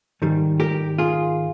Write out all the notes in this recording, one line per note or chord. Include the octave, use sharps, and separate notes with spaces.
G#2 D#3 G3
G4 A#4
F4 G#4